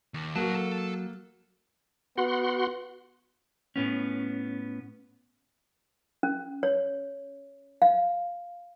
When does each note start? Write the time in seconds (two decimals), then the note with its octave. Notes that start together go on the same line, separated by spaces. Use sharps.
0.14 D#2
0.36 F#3 A#3 F#4 B4 A5
0.56 A4
2.18 B3 F#4 F#5 C6
3.76 A2 B3 C#4
6.23 C#4
6.63 C#5
7.82 F5